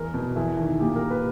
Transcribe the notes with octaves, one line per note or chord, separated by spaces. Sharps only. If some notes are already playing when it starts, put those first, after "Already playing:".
Already playing: E2 A#4
B2
E2 E4
D#3
A#2 G4
A#4
B4